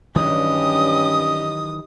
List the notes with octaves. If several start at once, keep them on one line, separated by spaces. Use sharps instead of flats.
G2 D#3 E3 F#3 C#4 G4 D#5 D#6